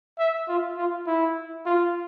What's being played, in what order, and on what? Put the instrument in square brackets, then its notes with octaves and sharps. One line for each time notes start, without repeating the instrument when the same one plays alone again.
[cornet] E5
F4
F4
E4
F4